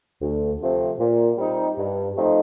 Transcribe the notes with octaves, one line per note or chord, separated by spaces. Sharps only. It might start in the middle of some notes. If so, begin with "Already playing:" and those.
D2
C3 F3 A3 C4
A#2
G3 C4 D#4
G2
F3 A3 C4 D#4